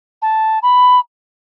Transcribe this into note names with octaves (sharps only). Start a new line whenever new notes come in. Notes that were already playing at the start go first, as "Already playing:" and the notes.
A5
B5